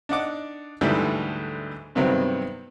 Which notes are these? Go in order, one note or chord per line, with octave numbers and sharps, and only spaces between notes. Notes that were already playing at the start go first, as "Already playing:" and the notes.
D4 D#4 F#5 D6
D2 G#2 D3 E3 G3
G2 C3 D#3 F#3 B3 C4